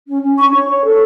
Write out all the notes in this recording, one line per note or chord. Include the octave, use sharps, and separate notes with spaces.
C#4
C#4
D4 C#6
C#5
C#5
A4